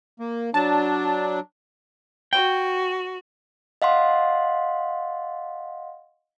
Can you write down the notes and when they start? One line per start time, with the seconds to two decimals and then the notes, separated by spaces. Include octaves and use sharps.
0.20 A#3
0.54 F#3 D4 A5
2.33 F#4 G5
3.82 D#5 F5 F#5 C6